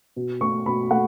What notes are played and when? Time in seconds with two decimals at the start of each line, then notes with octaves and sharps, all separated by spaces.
0.16 B2
0.41 A3 C#6
0.66 B2 B5
0.91 A3 F#5